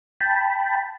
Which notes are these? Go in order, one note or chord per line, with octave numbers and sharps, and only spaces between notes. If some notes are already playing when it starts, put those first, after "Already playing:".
G5 A5 B5